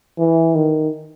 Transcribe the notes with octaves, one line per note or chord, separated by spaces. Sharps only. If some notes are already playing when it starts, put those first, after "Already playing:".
E3
D#3